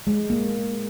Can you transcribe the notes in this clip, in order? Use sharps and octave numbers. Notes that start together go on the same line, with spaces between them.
G#3
A#3